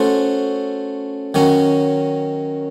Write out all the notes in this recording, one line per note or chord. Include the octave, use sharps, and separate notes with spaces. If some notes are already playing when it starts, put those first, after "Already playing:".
Already playing: A3 C#4 F#4 C5
D#3 F#3 C#4